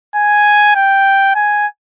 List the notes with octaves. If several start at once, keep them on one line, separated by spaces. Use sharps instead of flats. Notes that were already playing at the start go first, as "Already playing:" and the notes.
G#5
G5
G#5